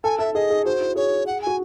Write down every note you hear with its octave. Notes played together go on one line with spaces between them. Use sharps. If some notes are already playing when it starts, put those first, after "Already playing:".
A4 G#5
A4 E5
G#4 D#5
G#4
F#4 C5
E4
G#4 C#5
F#5
F#4 G#5